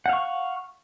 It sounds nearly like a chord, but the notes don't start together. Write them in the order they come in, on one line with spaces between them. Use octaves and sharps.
F#5 F5 C#6